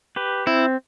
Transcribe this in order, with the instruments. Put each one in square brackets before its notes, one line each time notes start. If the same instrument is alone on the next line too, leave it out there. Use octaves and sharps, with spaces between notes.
[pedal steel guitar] G4 B4
[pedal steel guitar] C4 [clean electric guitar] E4